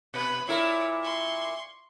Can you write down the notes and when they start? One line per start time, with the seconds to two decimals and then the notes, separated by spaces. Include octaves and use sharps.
0.14 B2 B4
0.47 A#2 E4 A#4 C#5 D5
1.02 C6 C#6